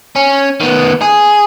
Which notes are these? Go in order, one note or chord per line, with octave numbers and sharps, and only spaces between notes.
C#4
D#3 B3
G#4